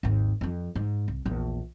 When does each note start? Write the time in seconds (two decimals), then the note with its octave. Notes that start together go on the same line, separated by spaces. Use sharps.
0.03 G#1 D#2
0.41 F2 F3
0.76 G#2
1.08 C2
1.26 A#1 E2